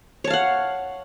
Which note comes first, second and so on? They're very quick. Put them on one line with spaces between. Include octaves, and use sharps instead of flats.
C#5 A5 F5 F#5